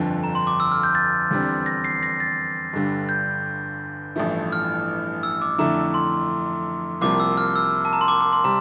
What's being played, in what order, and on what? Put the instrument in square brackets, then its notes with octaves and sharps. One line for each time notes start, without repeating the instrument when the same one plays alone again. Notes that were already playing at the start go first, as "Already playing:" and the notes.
Already playing: [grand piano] G1 F2 D3 F3
[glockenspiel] A#5
C6
D6
E6
F6
G6
A6
[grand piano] E2 D3 G3 C4
[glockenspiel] A#6
C7
A#6
A6
[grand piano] G1 G2 D3 G3
[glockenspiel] G6
[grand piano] A1 G2 F3 A3 E4
[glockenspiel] F6
E6
D6
[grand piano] F2 D3 A3 E4 [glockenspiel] A#5
[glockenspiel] C6
[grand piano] C2 C3 F3 A#3 [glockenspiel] D6
[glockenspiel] E6
F6
E6
A5
A#5
C6
D6
D6
C6
[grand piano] C3 G3 C4 [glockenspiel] A#5